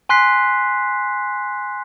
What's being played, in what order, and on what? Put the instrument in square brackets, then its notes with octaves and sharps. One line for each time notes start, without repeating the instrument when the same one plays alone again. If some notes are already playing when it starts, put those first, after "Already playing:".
[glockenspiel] G#5 C6 F#6 B6 C7